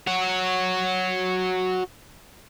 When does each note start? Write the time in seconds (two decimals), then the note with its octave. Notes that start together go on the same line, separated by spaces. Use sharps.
0.07 F#4 C#5